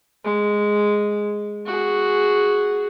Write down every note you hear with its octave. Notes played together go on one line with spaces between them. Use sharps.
G#3
F#4 G#4